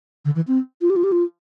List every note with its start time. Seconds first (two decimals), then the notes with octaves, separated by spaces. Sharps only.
0.25 D3
0.36 E3
0.48 C4
0.81 F4
0.90 G4
0.96 F4
1.04 G4
1.12 F4